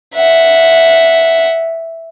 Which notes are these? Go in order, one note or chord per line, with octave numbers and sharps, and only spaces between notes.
E5 F#5